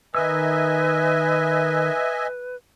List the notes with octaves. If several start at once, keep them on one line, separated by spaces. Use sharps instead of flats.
D#3 B4 D#5 E5 G#5 E6